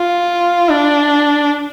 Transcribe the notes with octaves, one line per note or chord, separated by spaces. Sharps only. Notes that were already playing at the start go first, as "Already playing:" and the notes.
Already playing: F4
D4